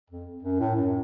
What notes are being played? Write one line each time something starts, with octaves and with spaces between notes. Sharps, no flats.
F2
F#2
A2
F#2